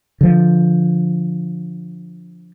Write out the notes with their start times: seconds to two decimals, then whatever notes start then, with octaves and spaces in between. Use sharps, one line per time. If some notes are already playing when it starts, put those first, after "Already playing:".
0.21 D3 F3